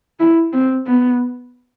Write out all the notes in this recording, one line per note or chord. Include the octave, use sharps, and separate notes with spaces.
E4
C4
B3